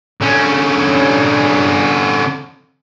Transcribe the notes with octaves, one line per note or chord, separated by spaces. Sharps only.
D3 C#4